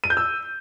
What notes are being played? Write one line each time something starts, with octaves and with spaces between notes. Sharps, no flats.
D#7
G6
E6